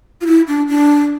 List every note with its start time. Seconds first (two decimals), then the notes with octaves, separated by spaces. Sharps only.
0.21 F4
0.27 E4
0.48 D4
0.68 D4